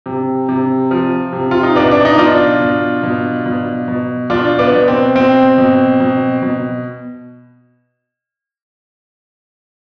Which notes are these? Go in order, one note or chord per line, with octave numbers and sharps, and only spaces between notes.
C3
C3
F3
C3
F4
D#4
B2 B3 D4
D4
D#4
B2 D4 F4
B2
B2
B2
B2
B2 D4 F4
B3 D4
B2
C4
B2 C4
B2
B2
B2